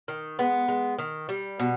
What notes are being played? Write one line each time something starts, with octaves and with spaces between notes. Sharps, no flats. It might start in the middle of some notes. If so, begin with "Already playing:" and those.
D#3
G#3 B3
G#3
D#3
G3
B2